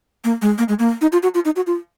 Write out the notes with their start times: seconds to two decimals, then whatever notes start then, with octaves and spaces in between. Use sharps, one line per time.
0.24 A#3
0.42 G#3
0.58 A#3
0.68 G#3
0.79 A#3
1.01 D#4
1.12 F4
1.23 F#4
1.34 F4
1.45 D#4
1.56 F#4
1.67 F4